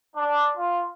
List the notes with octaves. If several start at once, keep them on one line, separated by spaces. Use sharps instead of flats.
D4
F4